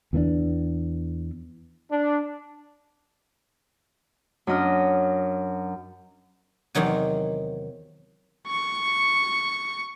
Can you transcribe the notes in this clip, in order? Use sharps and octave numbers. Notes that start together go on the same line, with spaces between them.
E2 E3 A3 D4
D4
F#2 D4 D#5 F6
E2 C3 D#3 F#3 F#4
C#6 C#7